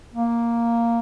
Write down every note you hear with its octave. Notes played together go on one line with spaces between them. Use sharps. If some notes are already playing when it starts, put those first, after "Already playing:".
A#3